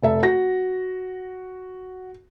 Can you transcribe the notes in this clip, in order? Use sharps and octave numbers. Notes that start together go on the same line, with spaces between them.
F1 A4 E5
F#4 A#6